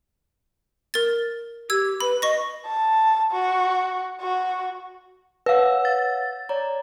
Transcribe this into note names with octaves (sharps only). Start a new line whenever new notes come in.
A#4 A6
G4 E6 G#6
B4 B5
D#5 C#6 A#6
A5
F#4
F#4
B4 C#5 F5 F#5 E6
A6
C#5 D5 A#5